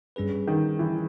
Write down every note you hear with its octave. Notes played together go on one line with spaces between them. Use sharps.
G2 G3 C#4 G#4 B4
D#3
E3